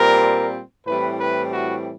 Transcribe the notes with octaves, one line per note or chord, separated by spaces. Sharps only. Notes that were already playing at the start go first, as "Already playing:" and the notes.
Already playing: A#2 G3 C4 A#4
A2 E3 G3 C4 B4
B4
F#4